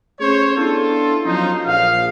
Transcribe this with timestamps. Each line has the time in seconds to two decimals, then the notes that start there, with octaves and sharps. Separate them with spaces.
0.20 A3 C#4 G#4 C5 C#5
0.57 B3 D4 E4 F4 A4
1.25 F3 F#3 C#4 D#4 F4 C5
1.66 A#1 F5